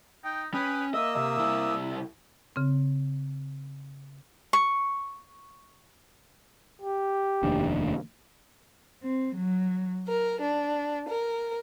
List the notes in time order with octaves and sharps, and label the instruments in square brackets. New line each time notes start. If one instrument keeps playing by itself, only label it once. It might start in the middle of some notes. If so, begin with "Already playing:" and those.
[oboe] D#4 [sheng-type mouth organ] G5
[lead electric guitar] C#4 [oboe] B4 [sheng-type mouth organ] G5 B5 D#6
[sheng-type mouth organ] A#3 D#6 E6 [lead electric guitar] D#5 [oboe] E5
[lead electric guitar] C3 [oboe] E5
[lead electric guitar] C2 E4
[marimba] C#3 C4
[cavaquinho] C#6
[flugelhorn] G4
[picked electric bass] F1 D#2 D4
[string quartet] C4
F#3
A#4
D4
A#4